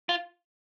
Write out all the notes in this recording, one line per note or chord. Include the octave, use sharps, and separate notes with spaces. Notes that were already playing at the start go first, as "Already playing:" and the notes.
F4